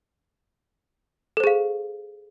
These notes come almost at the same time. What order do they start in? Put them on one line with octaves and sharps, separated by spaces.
A4 C5 G#4 F5